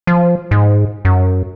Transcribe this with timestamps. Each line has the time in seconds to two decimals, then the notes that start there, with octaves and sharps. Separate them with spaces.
0.07 F3
0.51 G#2
1.05 F#2